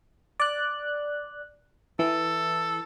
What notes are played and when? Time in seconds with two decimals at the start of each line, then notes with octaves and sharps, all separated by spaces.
0.40 D5 F#6
1.99 E3 A4